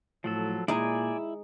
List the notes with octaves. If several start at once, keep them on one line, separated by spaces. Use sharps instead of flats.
A2 F3 F#3 A4
A#2 G#3 D#4 E4 D5 G#5